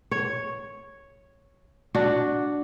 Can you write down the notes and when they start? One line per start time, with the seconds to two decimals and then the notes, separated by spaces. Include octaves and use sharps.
0.11 C#5
1.95 D4 F#4